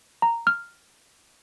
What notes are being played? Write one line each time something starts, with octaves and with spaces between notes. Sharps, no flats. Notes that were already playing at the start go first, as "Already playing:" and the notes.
A#5
F6